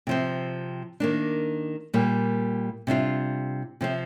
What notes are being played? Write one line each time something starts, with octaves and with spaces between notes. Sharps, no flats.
C3 F3 C4
D#3 A#3 D4
A#2 G3 A#3
C3 G3 D4 F4
C3 F3 C4